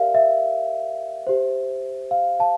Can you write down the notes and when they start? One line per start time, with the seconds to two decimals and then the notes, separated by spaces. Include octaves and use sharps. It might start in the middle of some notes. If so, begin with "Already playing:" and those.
Already playing: G4 A#4 D5 E5 F5
0.15 E5
1.27 G4 C5
2.11 F5
2.39 F5 A5